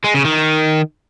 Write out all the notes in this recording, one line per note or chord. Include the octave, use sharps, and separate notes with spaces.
G#3
C#3
D#3